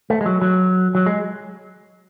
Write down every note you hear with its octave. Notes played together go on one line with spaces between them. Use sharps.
A3
G#3
F#3
F#3
F#3
G#3